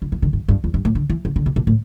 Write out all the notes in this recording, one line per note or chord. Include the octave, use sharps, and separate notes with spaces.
D3
E3
D3
G2
G2
E2
G2
A2
D3
E3
D3
D3
B2
B2
A2